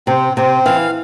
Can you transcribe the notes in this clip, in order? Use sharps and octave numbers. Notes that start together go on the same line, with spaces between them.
C3 C4
C3 C4
E3 F5